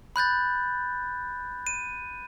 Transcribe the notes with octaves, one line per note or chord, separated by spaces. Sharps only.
B5 F#6 G6 A6
D#7